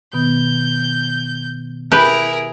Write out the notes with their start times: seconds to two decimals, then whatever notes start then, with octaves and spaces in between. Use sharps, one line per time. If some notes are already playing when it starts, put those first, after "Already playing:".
0.13 B2 D#3 B3 G6
1.92 E4 G4 G#4 A#4 B4